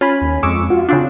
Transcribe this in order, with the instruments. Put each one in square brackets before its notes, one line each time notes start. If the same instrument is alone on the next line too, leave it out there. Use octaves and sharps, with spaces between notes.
[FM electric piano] C#4 G#5 B5 [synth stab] F4
[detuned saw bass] D#2
[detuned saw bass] F2 [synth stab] G#3 [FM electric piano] C#6 D6 E6
[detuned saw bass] F4 [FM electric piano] F#4
[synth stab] C#3 C4 D4